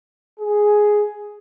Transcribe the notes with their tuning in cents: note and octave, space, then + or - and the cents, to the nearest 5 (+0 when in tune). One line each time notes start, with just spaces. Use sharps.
G#4 +5